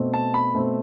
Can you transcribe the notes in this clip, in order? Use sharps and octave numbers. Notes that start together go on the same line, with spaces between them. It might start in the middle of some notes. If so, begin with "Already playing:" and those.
Already playing: B2 A3 C4
A5
B5
B2 A3 C4